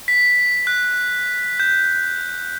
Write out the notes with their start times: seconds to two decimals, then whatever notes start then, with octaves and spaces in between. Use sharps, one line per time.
0.08 B6
0.67 F#6
1.60 G6